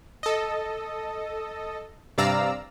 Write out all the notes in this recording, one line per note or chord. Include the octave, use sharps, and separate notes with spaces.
A4 D#5
G2 C3 D5 F5 A#5 E6